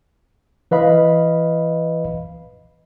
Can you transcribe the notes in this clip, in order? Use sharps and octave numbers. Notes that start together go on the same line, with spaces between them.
E3 B4 D#5 F5 B5